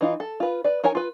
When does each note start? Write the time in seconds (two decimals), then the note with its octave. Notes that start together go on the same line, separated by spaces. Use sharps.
0.01 E3 D#4 F4
0.20 A4
0.40 F4 B4
0.64 B4 D5
0.84 D#4 A#4 C#5 G#5
0.95 F4 B4